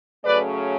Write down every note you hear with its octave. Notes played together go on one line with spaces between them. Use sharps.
C#3 F#3 A3 C#4 B4 D5